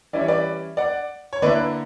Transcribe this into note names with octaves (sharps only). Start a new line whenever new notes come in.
E3 G3 C#4 E4 D5
C#5
B4 D5
D5 F#5
C#5
D3 A#3 E4 B4 D5